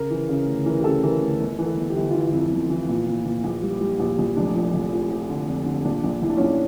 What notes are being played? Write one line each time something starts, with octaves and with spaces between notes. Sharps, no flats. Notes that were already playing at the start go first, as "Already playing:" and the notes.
Already playing: C#3 A#4
E3
C#3
D2
E3 A#4
G4
C#3 A4
E3 A#4
D2
G1
E3
A4
G1
G4
G1
F4
E3 E4
F2
G1
E3
A#2
A#2
A#2
A#1
G3
G3
A#1
A#1
F1 D4
F3
F1
F3
F3
D3
F2
D3
A#1 D4
A#1
A#1 E4
D4
C#4
A#1 D4